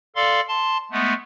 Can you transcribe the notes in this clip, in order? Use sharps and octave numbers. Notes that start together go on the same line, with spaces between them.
A4 D5 F5 C6
A5 C6
G#3 A3 B3